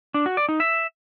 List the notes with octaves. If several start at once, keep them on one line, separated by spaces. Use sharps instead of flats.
D4
F#4
D5
D#4
E5